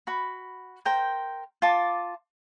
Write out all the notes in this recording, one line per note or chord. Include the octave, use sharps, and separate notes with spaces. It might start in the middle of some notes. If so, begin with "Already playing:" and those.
F#4 B5
A#4 C5 G5
F4 A5 D6